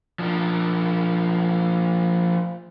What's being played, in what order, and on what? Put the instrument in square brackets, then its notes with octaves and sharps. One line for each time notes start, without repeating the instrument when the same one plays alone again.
[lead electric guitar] F3 D4